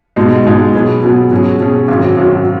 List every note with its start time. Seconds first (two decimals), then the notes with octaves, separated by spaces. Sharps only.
0.16 B2 G#3 D#4
0.46 B2 G#3 D#4
0.74 B2 F#3 B3 G#4
1.02 B2 F#3 B3 G#4
1.31 B2 F#3 C#4 G#4
1.60 B2 F#3 C#4 G#4
1.88 G#1 F#2 F#3
2.17 G#1 F#2 F#3